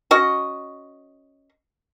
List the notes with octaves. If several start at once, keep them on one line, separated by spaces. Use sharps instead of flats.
C#4 F#4 D#5